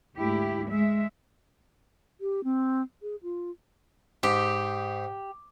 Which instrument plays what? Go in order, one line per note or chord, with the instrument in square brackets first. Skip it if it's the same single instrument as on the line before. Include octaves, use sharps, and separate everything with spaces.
[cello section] D2 G#2 E4 G4
G#3 E5
[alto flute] G4
C4
G#4
F4
[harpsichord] G#2 [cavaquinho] G4